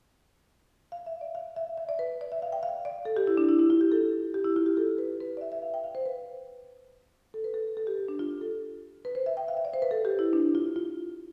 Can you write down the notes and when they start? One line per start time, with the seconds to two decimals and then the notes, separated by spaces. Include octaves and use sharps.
0.92 F5
1.06 E5
1.21 D5
1.35 F5
1.56 E5
1.78 E5
1.89 D5
1.99 B4
2.21 D5
2.32 E5
2.42 F5
2.52 G5
2.63 F5
2.85 D5
3.05 A4
3.17 G4
3.27 E4
3.37 D4
3.49 E4
3.59 E4
3.70 F4
3.81 G4
3.92 A4
4.34 G4
4.44 E4
4.56 F4
4.66 G4
4.77 A4
4.98 B4
5.20 B4
5.37 D5
5.41 E5
5.52 E5
5.62 F5
5.74 G5
5.84 F5
5.95 C5
6.06 B4
7.34 A4
7.44 B4
7.54 A4
7.77 A4
7.87 G4
8.08 D4
8.19 F4
8.41 A4
9.05 B4
9.15 C5
9.26 E5
9.37 G5
9.48 F5
9.57 E5
9.65 D5
9.74 C5
9.82 B4
9.91 A4
10.05 G4
10.19 E4
10.33 D4
10.55 F4
10.76 F4